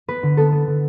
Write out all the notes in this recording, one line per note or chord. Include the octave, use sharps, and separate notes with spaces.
B3 B4
D3
B3 A4
B3
D3